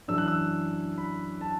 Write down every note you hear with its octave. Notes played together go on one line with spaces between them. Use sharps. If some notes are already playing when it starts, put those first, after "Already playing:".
F#2 E3 D4 E6
F#6
E6
B5
A5